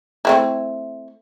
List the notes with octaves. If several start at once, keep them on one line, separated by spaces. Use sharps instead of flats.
A3 C4 E4